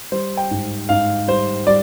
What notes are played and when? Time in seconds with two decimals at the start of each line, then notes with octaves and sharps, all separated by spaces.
0.12 G3 C5
0.37 G5
0.51 G#2
0.89 G#2 F5
1.28 G3 C5
1.67 G3 D5